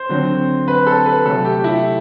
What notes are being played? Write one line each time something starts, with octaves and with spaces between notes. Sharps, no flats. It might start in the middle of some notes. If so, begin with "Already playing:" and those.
Already playing: C5
D3 F#3 C4
B4
A4
B4
C3 F#3 A3 A4
G4
E4